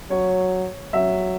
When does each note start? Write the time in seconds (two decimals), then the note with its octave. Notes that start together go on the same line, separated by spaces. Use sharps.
0.10 F#3 C#5
0.93 F#3 E5